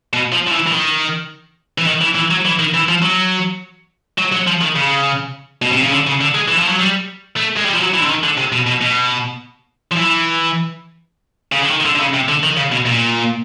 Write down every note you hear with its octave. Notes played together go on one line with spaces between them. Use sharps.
B2
F3
F3
E3
E3
D#3
E3
D#3
E3
E3
F#3
E3
D#3
E3
F3
F#3
F#3
F#3
F3
D#3
C#3
B2
C3
C#3
D3
C#3
D3
G#3
E3
F3
F#3
G3
A3
G#3
G3
F3
F#3
E3
D3
D#3
D3
C3
B2
B2
B2
F3
E3
C#3
D3
D#3
D#3
D3
D3
C#3
C3
D3
D#3
C#3
B2
A#2